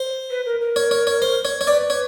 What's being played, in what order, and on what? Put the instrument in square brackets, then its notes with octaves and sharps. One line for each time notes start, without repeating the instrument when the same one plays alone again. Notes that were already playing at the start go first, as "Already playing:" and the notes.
Already playing: [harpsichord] C5
[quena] B4
A#4
A#4
[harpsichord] C#5
C#5
C#5
C5
C#5
C#5
[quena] B4 [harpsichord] D5
[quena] B4 [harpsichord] C#5